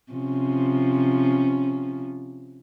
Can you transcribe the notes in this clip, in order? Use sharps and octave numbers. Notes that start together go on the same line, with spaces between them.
C3 F3 C#4